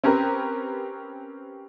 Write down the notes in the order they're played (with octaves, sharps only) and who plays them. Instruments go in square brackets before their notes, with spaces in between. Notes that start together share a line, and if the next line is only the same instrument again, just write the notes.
[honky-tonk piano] C4 C#4 G4 A#4 B4